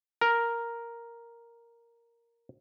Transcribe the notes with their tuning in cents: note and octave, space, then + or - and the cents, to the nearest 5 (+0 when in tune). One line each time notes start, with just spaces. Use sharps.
A#4 +0